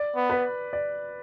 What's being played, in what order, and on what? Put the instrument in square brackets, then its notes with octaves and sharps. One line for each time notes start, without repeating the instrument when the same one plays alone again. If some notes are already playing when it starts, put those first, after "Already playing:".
Already playing: [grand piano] D5
[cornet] B3
[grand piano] B4
D5